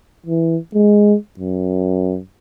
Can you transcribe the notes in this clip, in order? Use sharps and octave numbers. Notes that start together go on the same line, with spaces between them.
E3
G#3
F#2